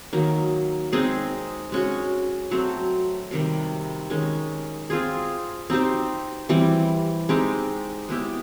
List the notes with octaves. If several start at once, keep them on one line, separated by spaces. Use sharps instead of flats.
D#3 F#3 A#3
G#3 C4 D#4 G#4
G#3 C#4 F#4
F#3 A3 C4
C3 D#3 G3
D#3 G#3 C#4
C4 F4 G#4
C4 D#4 G4 C5
E3 G3 C4
G#3 C4 D#4 G4
G#3 B3 E4 G4